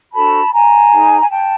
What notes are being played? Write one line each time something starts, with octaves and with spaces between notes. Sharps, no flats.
D4 F#4 A4 C5 A5 B5
G#5 A#5
D#4 G#4 C5
G#5
G5 A5